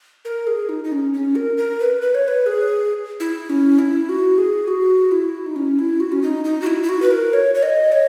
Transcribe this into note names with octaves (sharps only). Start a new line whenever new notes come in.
A#4
G#4
D#4
D#4
C#4
C#4
A#4
A#4
B4
B4
C#5
B4
G#4
E4
C#4
E4
F#4
G#4
F#4
E4
D#4
C#4
E4
F#4
C#4
D#4
D#4
F#4
E4
E4
F#4
B4
A#4
C#5
C#5
D#5
C#5